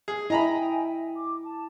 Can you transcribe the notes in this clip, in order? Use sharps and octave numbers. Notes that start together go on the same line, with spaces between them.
G#4
E4 D#5 E5 G5 G#5 A#5 B5
D6
A5